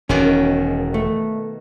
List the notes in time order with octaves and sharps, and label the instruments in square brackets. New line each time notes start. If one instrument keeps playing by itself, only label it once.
[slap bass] E1 [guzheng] B2 D#3 A#3 [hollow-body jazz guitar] C#4
[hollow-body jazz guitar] A3